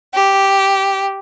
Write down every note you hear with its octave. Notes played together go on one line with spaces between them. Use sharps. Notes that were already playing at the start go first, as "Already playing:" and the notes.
G4